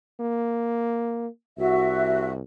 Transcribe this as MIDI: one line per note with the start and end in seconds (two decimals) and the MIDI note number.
0.20 1.27 58
1.58 2.41 36
1.58 2.30 66
1.58 2.30 76